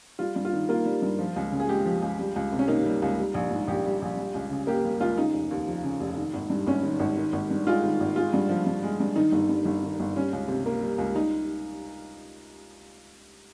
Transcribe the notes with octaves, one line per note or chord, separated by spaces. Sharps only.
G3 F4
G2
F4
D#3
A#3 F4
G3
G2
F3
C#2
C#3
G#4
G#3 G4
F3
C#2
G3
C#2
C3
C#4
A#3 D#4
G3
C#2
G3
A#1
G#2
A#1 G4
G3
A#1
G3
C#2
C#3
A#3 G4
G3
C#2 F4
C#3 D#4
F1
D#2
F3
C#3
F1
D#3
G#1
G2
G#1 C#4
D#3
G#1
D#3
G#1
G2
G#3 F4
D#3
G#1
G#3 F4
G2
F3
G2
G#3
G2
D#3 D#4
G1
G2
G1
D#3
G1
G3 C#4
C#2
C3
A#3
G3
C#2
G3 D#4